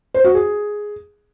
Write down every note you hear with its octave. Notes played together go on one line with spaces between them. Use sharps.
C5
F#4
G#4